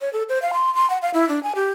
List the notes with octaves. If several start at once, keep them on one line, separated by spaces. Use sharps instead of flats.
C#5
A4
C5
F5
C6
C6
F#5
F5
E4
D4
G#5
G4